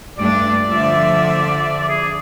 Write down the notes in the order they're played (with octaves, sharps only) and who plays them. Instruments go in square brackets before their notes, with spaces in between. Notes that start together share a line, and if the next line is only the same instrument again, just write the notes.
[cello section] G2 A3 D4 [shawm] D5
[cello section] D3 F3 E5
[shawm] G#4